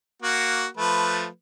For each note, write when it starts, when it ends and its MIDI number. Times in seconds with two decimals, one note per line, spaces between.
0.22 0.67 58
0.22 0.67 66
0.22 0.67 78
0.77 1.27 53
0.77 1.27 57
0.77 1.27 71